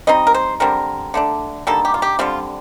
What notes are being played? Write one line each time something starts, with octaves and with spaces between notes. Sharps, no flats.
G3 C4 D#4 D#5
A#4
C5
D3 G3 C4 A#4
D3 A3 D4
D3 G3 A#3 D#4 A4
G4
F4
G4
D3 G3 C4 F4